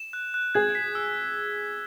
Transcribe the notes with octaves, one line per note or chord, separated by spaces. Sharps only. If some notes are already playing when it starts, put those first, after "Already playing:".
Already playing: E7
F#6
F#6
G#4 G#6
B6
E6